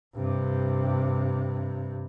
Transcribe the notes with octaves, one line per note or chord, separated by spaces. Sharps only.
G2 C3